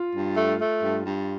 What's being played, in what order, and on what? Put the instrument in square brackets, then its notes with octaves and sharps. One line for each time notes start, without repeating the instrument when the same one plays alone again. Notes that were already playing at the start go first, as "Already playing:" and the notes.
Already playing: [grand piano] F4
[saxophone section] G2
A3
A3
G2
G2